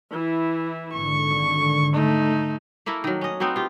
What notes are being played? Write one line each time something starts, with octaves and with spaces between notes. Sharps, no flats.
E3 E4
G#1 D3 C#6
A3 D#4
A3 A#3 E4 A#4
D#3 F#3
C#4 D#5
B3 C4 D#4 F#4
F4 G4